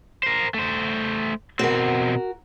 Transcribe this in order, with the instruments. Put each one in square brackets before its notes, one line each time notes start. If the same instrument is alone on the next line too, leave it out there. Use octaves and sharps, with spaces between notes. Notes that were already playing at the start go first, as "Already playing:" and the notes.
[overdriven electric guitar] A#4 C5
A3 C5
[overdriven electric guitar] B2 C4 [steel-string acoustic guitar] F#4 A#4